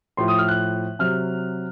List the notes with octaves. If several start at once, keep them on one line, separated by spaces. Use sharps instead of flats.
A2 F3 C6
D#6
F6
F#6
C3 F#3 F6